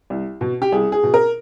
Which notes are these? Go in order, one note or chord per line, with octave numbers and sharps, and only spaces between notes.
C2
B2
G4
C2 G#4
G#4
B2
A#4